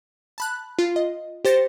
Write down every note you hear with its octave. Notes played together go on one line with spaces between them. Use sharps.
A5 B5 F#6
F4
D#5
G4 C5 A6 A#6 C#7